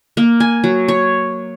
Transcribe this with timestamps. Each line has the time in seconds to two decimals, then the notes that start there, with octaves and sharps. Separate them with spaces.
0.17 A#3
0.40 G#5
0.64 F#3
0.88 C#5